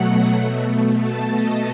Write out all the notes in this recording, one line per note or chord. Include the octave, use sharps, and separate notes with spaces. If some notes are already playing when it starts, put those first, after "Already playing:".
Already playing: B2 F#3 A3 F#5
B2 A3
A5
D#5